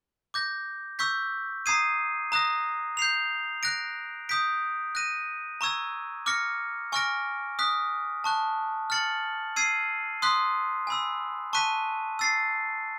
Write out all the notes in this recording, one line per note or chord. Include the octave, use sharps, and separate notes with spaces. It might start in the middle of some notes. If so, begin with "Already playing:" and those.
D6 G6 A#6
C#6 E6 G6 B6
A#5 D#6 G#6 C7 D#7
A#5 D#6 F#6 A#6
G6 C7 F7
F#6 A#6 D7
D#6 G6 B6 D7
F#6 A#6 D#7
A#5 C#6 E6 G#6
D6 F6 A#6 C#7
G#5 C#6 F6 A#6 D7
D#6 F#6 B6
A5 C#6 F#6
F6 A6 C#7 F#7
E6 G#6 C7 D#7
C6 D#6 F#6 B6
G#5 B5 E6
A5 C#6 F#6 B6 D#7
E6 A6 C7